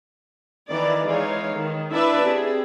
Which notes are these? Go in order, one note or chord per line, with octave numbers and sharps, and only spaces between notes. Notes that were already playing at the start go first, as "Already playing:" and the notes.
D#3 E3 D5
E3 G#3 D#4 C#5 F5
D#3
D4 E4 B4 D5 E5 A5
C4 G4 G#4